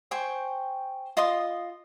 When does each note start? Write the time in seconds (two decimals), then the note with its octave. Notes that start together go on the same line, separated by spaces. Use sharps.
0.11 C5 G5 G#5 C#6
1.17 F4 D#5 C6 D#6